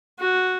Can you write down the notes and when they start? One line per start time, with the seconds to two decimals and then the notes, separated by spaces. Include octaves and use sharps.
0.19 F#4